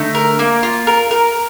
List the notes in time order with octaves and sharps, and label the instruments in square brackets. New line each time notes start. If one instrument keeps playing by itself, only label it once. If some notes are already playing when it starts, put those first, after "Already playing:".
Already playing: [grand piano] D3 [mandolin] A3 D#4
[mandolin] A#4
A#3
F4
A#4
A#4